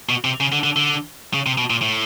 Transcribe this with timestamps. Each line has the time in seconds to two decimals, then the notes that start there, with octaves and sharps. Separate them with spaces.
0.09 B2
0.24 C3
0.40 C#3
0.52 D3
0.64 D3
0.76 D3
1.34 C#3
1.46 C3
1.58 B2
1.70 A#2
1.82 A2